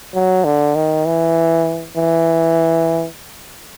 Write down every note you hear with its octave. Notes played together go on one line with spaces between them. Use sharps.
F#3
D3
D#3
E3
E3